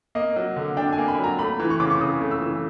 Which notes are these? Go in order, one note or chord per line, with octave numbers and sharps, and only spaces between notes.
A#3 D#5
F#3
D3
D4 G5
G#5
A#3
B5
F#3
A#5
A3 B5
E3
C#6
C#3 D6
C#6
C#3 D#6
A3
E6
E3